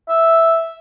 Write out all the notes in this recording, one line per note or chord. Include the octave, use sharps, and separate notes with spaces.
E5